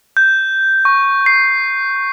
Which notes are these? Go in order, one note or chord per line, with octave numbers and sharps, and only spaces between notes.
G6
C#6
C7